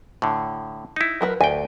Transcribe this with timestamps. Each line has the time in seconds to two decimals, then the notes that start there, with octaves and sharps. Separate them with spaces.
0.22 A2 D3
0.96 D#4 E4
1.21 F#3 A#4 B4
1.41 D2 G5 G#5